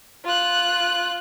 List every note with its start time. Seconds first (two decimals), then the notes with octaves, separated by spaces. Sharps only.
0.25 F4 F#6